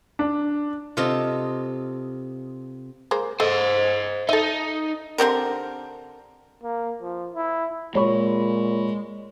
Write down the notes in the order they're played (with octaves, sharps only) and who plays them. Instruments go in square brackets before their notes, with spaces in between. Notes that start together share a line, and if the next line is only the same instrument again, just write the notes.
[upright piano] D4
[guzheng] C3 F4 A4 D#5
[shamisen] G#3 A#3 C5
[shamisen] A3 [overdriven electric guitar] C5 D#5
[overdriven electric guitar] D#4 [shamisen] A4 E5
[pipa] D3 C4 G4 A#4
[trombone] A#3
F3
E4
[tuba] A#2 [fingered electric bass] G#3 [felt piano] C#5 B5 C#6